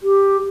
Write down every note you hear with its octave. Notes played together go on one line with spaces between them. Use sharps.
G4